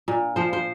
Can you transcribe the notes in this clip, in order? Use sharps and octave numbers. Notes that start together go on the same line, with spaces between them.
A#2
F3 C5
C5